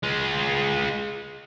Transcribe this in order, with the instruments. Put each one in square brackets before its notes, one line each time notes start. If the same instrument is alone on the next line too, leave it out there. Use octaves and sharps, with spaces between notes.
[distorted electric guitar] G#3 F4